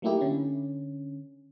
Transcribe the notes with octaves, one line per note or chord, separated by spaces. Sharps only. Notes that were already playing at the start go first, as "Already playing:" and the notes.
F#3 A3 A#3 D#4 E4 G4
D3 C#4